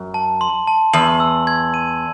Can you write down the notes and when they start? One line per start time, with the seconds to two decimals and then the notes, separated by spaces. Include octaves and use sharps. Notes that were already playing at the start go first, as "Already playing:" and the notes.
Already playing: F#2
0.14 A5
0.41 C6
0.67 A5
0.93 E2 F#7
1.20 E6
1.47 G#6
1.74 D#7